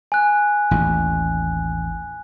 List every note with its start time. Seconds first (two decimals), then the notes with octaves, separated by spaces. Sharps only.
0.12 G#5 F#6
0.71 A1 D#2